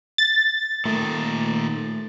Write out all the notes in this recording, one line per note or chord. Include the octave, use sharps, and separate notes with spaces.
A6
A#2 D#3 A3